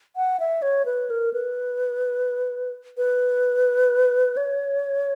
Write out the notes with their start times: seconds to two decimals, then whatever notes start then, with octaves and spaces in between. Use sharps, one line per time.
0.16 F#5
0.40 E5
0.62 C#5
0.85 B4
1.10 A#4
1.33 B4
2.97 B4
4.37 C#5